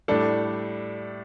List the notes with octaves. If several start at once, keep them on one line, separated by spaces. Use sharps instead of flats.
A2 G3 D4 A4